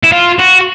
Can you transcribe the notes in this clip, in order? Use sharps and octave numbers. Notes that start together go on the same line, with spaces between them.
E4
F4
F#4